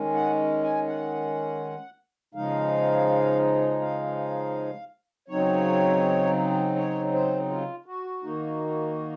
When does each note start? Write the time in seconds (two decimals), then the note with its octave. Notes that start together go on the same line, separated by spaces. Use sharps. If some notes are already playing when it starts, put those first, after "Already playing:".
Already playing: D#3 G#3 C#4
0.14 F#5
0.63 G#5
0.87 F#5
2.34 C#3 F3 G#3 D#4 F5
3.81 F5
5.28 C#3 F#3 C4 D#4 C#5
6.76 C#5
7.13 C5
7.50 F4
7.86 F#4
8.23 D#3 A#3 D#4